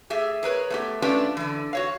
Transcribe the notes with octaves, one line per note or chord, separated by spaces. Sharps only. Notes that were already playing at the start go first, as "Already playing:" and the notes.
A3 G4 G#4 E5
G#4 A#4 B4 C#5
A3 B3 G4
A3 C#4 D4 F4 G4 B4
D3 E3
F#4 C#5 F5